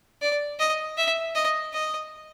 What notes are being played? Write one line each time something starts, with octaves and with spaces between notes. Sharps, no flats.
D5
D#5
E5
D#5
D#5